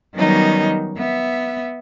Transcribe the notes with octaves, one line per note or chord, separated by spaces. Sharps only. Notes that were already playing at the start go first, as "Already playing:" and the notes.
D#3 F#3 G3 B3 C#4 D#4
B3 E5